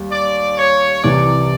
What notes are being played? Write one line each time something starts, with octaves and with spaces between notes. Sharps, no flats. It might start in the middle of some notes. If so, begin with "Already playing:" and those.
Already playing: D#2 G3
D5
C#5
C2 C3 E3 D5